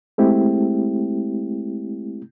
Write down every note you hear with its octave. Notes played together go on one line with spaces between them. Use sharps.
G#3 A3 C4 E4 G4